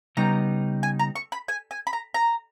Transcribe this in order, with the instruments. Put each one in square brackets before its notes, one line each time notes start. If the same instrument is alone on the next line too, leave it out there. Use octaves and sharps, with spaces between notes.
[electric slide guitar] C#3 G3 B3 D#4 [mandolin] A#5
[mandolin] G#5
A#5
C#6
B5
G#5
G#5
B5
A#5
A#5